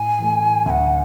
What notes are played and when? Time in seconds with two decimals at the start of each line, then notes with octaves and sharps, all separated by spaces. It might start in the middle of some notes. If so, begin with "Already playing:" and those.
Already playing: A2 G#5
0.19 E3 A3
0.66 D2 G#5
0.70 F#5